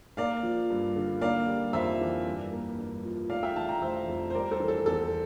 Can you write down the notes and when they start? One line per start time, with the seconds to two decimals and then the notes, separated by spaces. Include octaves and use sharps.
0.17 A#3 D5 F5
0.43 F3
0.70 G2
0.96 D3
1.21 A#3 D5 F5
1.47 G3
1.73 F2 C5 E5
2.00 E3
2.26 G2
2.52 A#3
2.78 G2
3.03 F3
3.30 A3 D5 F5
3.43 E5 G5
3.56 E3 F5 A5
3.68 G5 A#5
3.81 F1 C5 E5
4.07 F2
4.30 C5
4.34 G3 A#4 D5
4.51 A4 C5
4.60 E3
4.68 A4
4.86 E2 A4